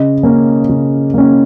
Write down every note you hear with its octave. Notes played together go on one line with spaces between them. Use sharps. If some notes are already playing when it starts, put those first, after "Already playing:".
Already playing: C#3 D#5
A#3 C#4
C#3
A#3 C#4